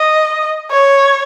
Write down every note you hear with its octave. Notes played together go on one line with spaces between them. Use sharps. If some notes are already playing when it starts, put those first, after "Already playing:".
Already playing: D#5
C#5